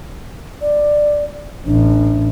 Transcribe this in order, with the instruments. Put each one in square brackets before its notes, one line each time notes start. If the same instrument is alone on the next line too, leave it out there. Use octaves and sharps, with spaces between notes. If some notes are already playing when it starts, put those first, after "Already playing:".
[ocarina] D5
[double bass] A1 [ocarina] D4